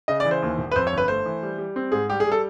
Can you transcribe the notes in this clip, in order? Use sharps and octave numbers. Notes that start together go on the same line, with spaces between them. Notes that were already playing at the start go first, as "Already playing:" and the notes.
C#3 D#5
D5
E3
C5
D#2
E1
B4
F2 C5
C#5
G1 B4
A3 C5
E3
G3
G3
C4
G#2 G#4
G3 G4
G#4
G3
A4